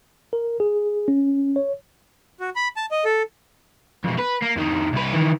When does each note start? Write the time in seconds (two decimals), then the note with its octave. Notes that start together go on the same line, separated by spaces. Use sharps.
0.33 A#4
0.60 G#4
1.08 C#4
1.56 C#5
2.40 F#4
2.56 B5
2.76 A5
2.91 D#5
3.05 A4
4.04 F2 B2
4.18 B4
4.42 A#3
4.56 F2 D#3
4.93 C2 B4
5.13 D#3 E3